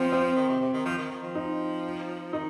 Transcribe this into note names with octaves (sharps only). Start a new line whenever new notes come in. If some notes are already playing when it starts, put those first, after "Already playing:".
Already playing: F3 C4
C4
D#3
C3
C3
D#3
F3
D#3
D#3
F3
D#4
D#3 D#4